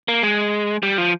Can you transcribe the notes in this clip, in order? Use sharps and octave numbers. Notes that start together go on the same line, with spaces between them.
A#3
G#3
G3
F3